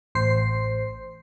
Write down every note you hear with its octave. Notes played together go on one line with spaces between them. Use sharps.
A1 C5 C7